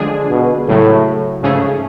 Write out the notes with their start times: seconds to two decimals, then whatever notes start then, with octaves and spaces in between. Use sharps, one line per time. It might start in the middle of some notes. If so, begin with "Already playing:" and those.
Already playing: D3 F3 G#3 D4 G#4
0.30 B2
0.68 A2 C#3 F#3 A3
1.43 G#2 C#3 F3 A3 C#4 G#4